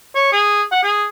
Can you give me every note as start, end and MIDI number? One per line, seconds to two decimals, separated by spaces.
0.15 0.28 73
0.33 0.63 68
0.72 0.81 78
0.83 1.06 68